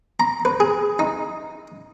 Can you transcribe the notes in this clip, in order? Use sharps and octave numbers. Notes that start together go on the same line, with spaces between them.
A#5
B4
G#4
D#4